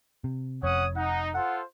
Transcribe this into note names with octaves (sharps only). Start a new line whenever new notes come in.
C3
F1 F2 C#4 C#5 F#5 D#6
D#4 F#5
F4 A4 C5 F#5